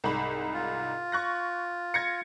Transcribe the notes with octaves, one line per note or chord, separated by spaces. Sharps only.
C2 G#2 B5
F4
C#6 F#6 A#6
G#6 A#6 C#7